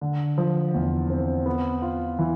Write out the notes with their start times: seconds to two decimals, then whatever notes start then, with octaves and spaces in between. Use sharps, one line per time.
0.01 D3
0.38 F3
0.74 E2
1.10 C4
1.46 B3
1.82 F4
2.19 E3